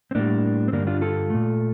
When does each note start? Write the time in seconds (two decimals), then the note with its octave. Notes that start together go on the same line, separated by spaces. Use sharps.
0.11 C4
0.15 A2 G3 A#3 D4
0.68 C4
0.72 G2 D3 G3 A#3 D4
0.87 D4 F4
1.01 F4 A4
1.30 A#2 A3